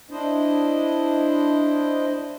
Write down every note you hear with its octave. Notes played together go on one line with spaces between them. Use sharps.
D4 E4 C5 D#5